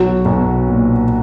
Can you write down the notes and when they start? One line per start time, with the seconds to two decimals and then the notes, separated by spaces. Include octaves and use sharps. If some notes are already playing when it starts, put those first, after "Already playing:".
Already playing: B1 F#3 F#4
0.25 B1
0.68 A#2